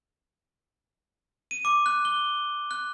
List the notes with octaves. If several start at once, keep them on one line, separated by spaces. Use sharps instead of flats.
D#7
D6
F#6
G7
F#6